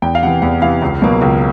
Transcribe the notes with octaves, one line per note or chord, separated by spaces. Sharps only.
E2 G5
F5
C3 E3 F#5
E2 F#5
C3 E3 F5
C#2
B2 F#3 A#3
C#2